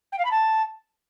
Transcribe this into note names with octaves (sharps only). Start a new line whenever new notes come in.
G5
F5
B5
A5